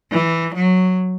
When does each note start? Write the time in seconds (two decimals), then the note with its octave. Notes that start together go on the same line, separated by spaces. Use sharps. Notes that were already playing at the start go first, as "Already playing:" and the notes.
0.12 E3
0.55 F#3